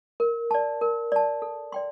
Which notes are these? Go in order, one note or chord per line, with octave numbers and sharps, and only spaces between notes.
A#4
D5 A5
A#4
D5 A5
A4
D5 G5 C6